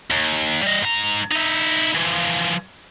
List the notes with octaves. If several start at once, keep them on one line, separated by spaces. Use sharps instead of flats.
D#2
G3 D#5
G#2 A#5
D#4 E4
E3 F3